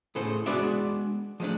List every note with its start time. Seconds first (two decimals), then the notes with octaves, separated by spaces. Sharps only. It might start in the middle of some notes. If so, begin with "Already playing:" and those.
0.15 A2 C#3 A4 C5
0.46 G#3 B3 D4 F#4 D5 E5
1.40 F3 G#3 A3 D4